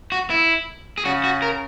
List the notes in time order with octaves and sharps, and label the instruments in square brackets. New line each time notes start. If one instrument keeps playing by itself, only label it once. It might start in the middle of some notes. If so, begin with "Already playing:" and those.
[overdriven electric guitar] F#4
E4
G#4
[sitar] C#3 [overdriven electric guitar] F#4
[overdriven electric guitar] F#4
A#4